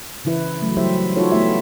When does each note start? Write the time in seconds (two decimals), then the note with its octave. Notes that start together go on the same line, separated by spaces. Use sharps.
0.25 C#3 E3 E4 B4
0.62 F#3 A3
0.77 F#3 G3 E4 G4 C5 E5
1.16 D#4 F4 F#4 A4 C#5
1.32 A3 B3 E4 G4 E5